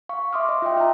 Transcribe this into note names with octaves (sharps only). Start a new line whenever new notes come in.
F5 C#6
E5 C6 D6 D#6 F6
D#5
F4 E5 F5 G5
F4 E5 F5 G5 A5 A#5